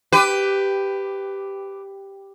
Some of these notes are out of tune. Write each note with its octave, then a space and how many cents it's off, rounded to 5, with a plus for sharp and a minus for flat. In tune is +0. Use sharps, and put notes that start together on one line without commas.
G4 +0 B4 +15